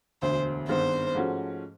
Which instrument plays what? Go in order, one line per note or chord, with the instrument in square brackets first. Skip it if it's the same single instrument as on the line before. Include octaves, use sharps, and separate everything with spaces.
[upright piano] E1 D2 D3 [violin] C5
[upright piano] G#1 G2 D#3 G#3 B3 [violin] C5
[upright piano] G#2 F3 A3 C#4 F#4